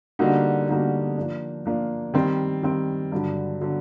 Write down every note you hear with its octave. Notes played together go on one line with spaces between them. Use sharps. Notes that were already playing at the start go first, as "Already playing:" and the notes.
D3 G3 A#3 D#4 F#4
D3 G3 A#3 D#4 F#4
F3 A#3 D4
F3 A#3 D4
D#3 G3 C4
D#3 G3 C4
G2 D3 F#3
D3 F#3